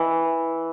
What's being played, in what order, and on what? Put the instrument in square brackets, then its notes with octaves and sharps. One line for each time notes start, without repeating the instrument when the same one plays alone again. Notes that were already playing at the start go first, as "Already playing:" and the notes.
Already playing: [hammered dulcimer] E3